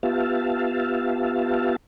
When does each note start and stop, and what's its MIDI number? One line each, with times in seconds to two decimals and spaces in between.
0.03 1.76 59
0.03 1.76 65
0.03 1.76 67
0.03 1.76 76
0.03 1.76 77
0.03 1.76 81